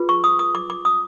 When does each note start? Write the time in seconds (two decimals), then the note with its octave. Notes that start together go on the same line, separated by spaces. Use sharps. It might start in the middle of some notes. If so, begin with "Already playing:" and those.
Already playing: F4 G#4 B4
0.09 C#6
0.24 D#6
0.39 D#6
0.55 D6
0.70 D6
0.85 D#6